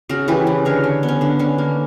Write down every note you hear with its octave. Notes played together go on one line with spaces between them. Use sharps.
C#3 F#4 A#4
E3 G4 B4
C#3
D3 A#4 C#5
D3
B3
C#4
D3 D4
D3 C#4
A#3